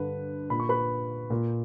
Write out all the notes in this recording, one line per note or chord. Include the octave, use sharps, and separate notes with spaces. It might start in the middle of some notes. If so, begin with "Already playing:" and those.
Already playing: G2 D3 B4
A#2 B5
C#6
B4 B5
A#2